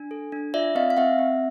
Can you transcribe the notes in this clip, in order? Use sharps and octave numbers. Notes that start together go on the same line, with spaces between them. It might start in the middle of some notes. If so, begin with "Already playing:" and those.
Already playing: D4 G#5
A4
D4
F4 D5 E5
C4 D#5 F5
F5
C4 E5 F#5
C4